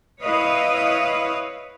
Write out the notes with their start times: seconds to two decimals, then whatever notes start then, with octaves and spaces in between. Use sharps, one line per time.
0.22 E4 B4 C#5 D#5 F5